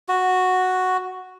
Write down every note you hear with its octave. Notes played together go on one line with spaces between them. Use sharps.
F#4